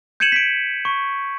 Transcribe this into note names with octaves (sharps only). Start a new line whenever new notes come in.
G6 G#6 C#7 D#7 E7 F#7
B6 D7
C#6